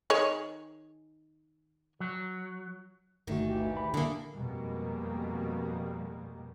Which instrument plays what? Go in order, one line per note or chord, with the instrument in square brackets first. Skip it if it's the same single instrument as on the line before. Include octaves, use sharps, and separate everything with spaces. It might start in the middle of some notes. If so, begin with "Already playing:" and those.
[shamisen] D#3 G#4 C#5
[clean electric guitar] F#3
[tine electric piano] G1 A3 F#4 [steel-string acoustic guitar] A#2 D#3
[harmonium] D2 E3 G4
[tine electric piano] B5
[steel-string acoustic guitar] D3 A#3 [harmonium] E4 G#4
[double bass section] F2 B2 G3 G#3 A#3